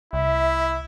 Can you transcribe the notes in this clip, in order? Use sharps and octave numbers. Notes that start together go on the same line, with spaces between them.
C2 E4 E5